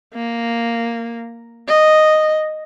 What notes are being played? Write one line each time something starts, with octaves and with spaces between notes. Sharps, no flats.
A#3
D#5